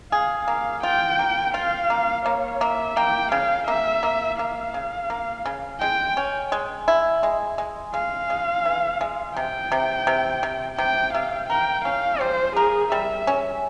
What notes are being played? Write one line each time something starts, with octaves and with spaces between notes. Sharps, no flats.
G#4 F5
A#3 F5
F4 G5
A#3
F4 F5
A#3
A#3 C#5
A#3 E5
A#3 G5
C#3 F5
A#3 E5
A#3
A#3 F5
C#3
A#3
C#3
G#3 G5
C#4
G#3
E4
G#3
G#3
G#3 F5
G#3
E3
G#3
C3 G5
C3
C3
C3
C3 G5
C3 F5
A#4 G5
C#4 F5
G3 C5
G#4 A#4
G3 E5
C#4